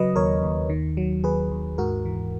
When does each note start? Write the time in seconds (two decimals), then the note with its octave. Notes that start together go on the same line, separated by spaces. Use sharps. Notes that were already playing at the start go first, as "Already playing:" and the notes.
Already playing: C#3 F#3 B4 D#5
0.16 D#2 A#4 C#5
0.43 D#2
0.70 D#3
0.97 F#3
1.24 D#2 G#4 B4
1.51 D#2
1.78 G#2 F#4 A#4
2.05 E3